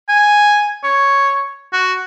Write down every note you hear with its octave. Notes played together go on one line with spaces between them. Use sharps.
G#5
C#5
F#4